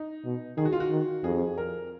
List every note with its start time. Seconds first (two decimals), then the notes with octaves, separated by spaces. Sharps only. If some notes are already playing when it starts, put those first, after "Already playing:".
Already playing: D#4
0.25 B2
0.57 D#3 G#4
0.65 F#4
0.72 F4
0.80 F#4
0.91 D#3
1.24 F2 G#4
1.58 A#4